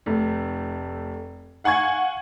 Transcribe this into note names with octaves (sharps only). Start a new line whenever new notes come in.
F1 A3
F5 F#5 G#5 C#6 G#6